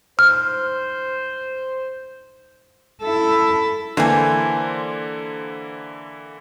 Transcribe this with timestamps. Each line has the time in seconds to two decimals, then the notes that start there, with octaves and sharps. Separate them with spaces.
0.19 C5 F6
3.03 E4 A4
3.97 D3 E3 A#3 C5 G#5